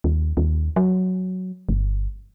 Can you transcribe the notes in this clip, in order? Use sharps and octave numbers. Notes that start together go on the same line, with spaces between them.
D#2
D#2
F#3
G1